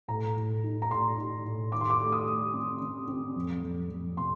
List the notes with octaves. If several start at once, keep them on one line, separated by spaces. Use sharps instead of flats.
A2 A#5
A2
D#4
A#5
A2 C6
D#4
A2
D#3 D6
C6
D6
A3
D#6
A3
C4
C4
C4
F2
F2
F2
C3 C6